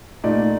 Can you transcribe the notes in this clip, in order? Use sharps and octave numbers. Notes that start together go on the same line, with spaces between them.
A#2 A3 D#4 D5